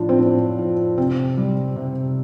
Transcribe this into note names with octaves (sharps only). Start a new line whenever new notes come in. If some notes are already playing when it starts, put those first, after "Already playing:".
Already playing: A2 F3 D4 F4
C4
A2 D4
F3
C3 C4
G3
C3